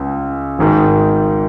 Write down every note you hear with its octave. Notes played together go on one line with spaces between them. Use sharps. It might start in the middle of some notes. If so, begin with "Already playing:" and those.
Already playing: C#2 C#3
G#1 G#2 D#3